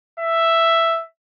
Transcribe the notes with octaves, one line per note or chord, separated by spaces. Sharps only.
E5